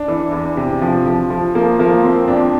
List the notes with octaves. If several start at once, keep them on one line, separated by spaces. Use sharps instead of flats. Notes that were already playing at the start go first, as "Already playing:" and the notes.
Already playing: D4
E3
E2
C3
F3
F3
F3
F3 A#3
F3 A#3
F3 C4
F2 D4